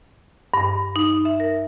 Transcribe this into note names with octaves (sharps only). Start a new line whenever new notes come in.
G2
D#4
E5
A#4